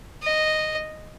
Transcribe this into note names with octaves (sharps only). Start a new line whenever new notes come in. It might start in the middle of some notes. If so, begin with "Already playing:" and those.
D#5